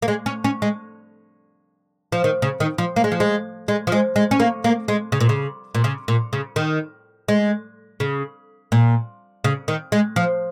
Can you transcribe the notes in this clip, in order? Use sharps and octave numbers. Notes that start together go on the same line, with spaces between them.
A#3
G#3
C#4
C#4
G#3
F3
D#3
C#3
D#3
F3
A#3
G#3
F3
G#3
G#3
F3
G#3
G#3
C#4
A#3
A#3
G#3
C#3
A#2
C#3
A#2
C#3
A#2
C#3
D#3
G#3
C#3
A#2
C#3
D#3
G#3
F3